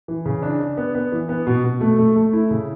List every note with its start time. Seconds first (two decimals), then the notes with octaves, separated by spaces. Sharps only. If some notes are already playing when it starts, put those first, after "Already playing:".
0.08 E3
0.25 C#3
0.43 D4
0.60 D4
0.77 B3
0.95 B3
1.12 E3
1.29 B3
1.47 B2
1.64 B2
1.81 A3
1.99 A3
2.16 A3
2.33 E4
2.51 C#3